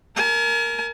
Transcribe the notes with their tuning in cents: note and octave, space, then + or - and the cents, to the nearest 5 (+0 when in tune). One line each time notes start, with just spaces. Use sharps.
A#4 +0 G#5 +45